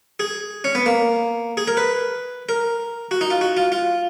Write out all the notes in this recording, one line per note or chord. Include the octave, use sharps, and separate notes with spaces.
G#4
C#4
B3
A#3
G#4
A#4
B4
A#4
F#4
D#4
F4
F#4
F4
F4